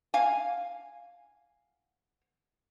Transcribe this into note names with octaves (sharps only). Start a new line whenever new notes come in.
F5 G#5